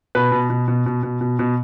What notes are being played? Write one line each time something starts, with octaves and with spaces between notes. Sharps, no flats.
B2 B4
B2
B2
B2
B2
B2
B2
B2